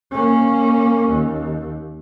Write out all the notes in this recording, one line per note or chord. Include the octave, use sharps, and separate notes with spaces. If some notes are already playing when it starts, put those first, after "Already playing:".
A#3 C#4
D#2